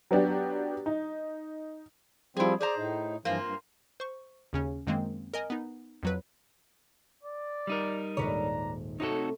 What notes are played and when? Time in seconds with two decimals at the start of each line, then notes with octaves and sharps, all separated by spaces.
0.11 F#3 B3 D4 G4
0.86 D#4
2.37 F3 G3 C4 E4 G#4
2.61 G#4 C5 D5 A#5
2.77 A2 D#4
3.25 G2 E3 F3 A#3 C4 F4
3.44 G2
4.00 C5 C#6
4.53 D#2 C#3 C#4
4.87 F#2 D#3 G#3 A#3 C4
5.34 A#4 D#5 G#5
5.50 B3 D#4
6.03 F2 F#3 B4
7.23 D5
7.67 G3 D#4 A#4
8.17 D#1 G#2 D4 B4 C#5 A#5
9.00 C3 A3 D#4 F#4 A4 C#5